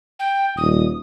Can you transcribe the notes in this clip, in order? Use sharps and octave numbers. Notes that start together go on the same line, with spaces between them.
G5
D#1 D#6